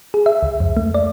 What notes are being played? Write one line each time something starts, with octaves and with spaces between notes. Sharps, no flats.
G#4
E5
C#2
F2
A3
D5